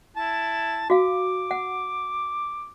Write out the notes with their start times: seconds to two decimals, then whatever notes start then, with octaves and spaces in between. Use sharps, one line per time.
0.17 E4 A5
0.90 F#4 F5 D6
1.51 F#5